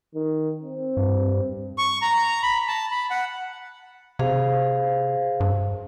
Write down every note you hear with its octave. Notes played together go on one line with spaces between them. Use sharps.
D#3
C4
G2
C#6
A#5
B5
A5
B5
F#5
C3 G#4 C5 F5
G2